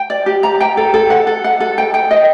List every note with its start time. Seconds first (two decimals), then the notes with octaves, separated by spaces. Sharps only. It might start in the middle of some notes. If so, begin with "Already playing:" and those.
Already playing: G5
0.10 D5
0.26 G4
0.43 A#5
0.60 G5
0.77 A4
0.94 A4
1.10 F#5
1.27 A4
1.44 F#5
1.60 A4
1.78 G5
1.94 G5
2.11 D#5